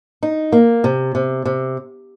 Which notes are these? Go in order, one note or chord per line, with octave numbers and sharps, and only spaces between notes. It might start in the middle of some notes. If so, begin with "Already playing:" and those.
D#4
A#3
C3
C3
C3